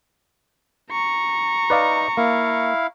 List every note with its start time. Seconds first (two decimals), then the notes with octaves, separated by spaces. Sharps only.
0.91 A#5 C#6
1.70 D#4 B4 D5 F5
2.17 A#3 E4 F5